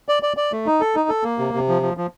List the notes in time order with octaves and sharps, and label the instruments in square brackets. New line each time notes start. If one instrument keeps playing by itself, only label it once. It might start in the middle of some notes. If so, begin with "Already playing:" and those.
[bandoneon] D5
D5
D5
A3
D#4
A4
D#4
A4
A#3
C3
C3
F3
F3
F3